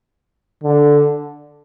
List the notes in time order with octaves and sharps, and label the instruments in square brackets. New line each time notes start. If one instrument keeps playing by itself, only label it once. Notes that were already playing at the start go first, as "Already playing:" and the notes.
[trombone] D3